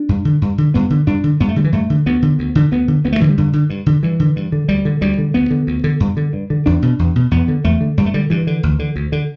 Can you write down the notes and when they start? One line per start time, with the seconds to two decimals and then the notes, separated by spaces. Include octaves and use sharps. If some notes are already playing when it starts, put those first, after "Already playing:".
Already playing: D4
0.09 G2
0.25 D3
0.42 G2
0.58 D3
0.74 G2 B3
0.90 D3
1.07 G2 D4
1.24 D3
1.40 G2 B3
1.49 A3
1.56 D3 G3
1.64 E3
1.72 G2 A3
1.90 D3
2.06 D2 B3
2.22 D3
2.39 D2
2.55 D3
2.72 D2 B3
2.88 D3
3.04 D2 B3
3.12 A3
3.20 D3 E3
3.29 G3
3.38 G2 D3
3.53 D3
3.70 G2
3.86 D3
4.03 G2 E3
4.20 D3
4.36 G2
4.52 D3
4.68 D2 G3
4.85 D3
5.01 D2 G3
5.18 D3
5.34 D2 B3
5.50 D3
5.67 D2
5.84 D3
6.00 G2
6.17 D3
6.33 G2
6.50 D3
6.66 E2 D4
6.82 B2
6.99 E2
7.16 B2
7.31 E2 B3
7.48 D3
7.64 E2 A3
7.81 D3
7.97 G2 G3
8.06 A3
8.14 D3 G3
8.30 G2 E3
8.47 D3
8.63 D2
8.79 D3
8.96 D2
9.12 D3